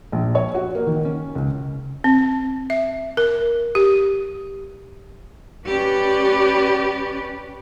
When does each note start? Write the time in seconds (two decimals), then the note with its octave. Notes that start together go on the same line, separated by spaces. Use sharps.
0.12 A#1
0.35 C#5
0.54 F#4
0.75 A#3
0.87 D#3
1.05 C#4
1.35 C#2
2.04 C4
2.70 E5
3.17 A#4
3.75 G4
5.66 C#4 G4 B4 D5